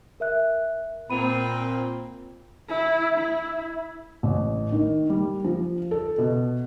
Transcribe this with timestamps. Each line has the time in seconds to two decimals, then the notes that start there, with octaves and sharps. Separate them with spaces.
0.20 A#4 E5 F#6
1.10 A#2 C4 B5 D#7
2.69 E4
3.18 E4
4.23 A1
4.72 D#3
5.10 G3
5.44 F3
5.91 A4
6.18 B2